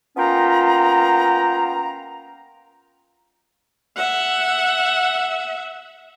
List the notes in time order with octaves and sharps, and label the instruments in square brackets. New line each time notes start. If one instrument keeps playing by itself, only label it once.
[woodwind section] A#3 B3 C#4 F4 G5 A#5
[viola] E5 F#5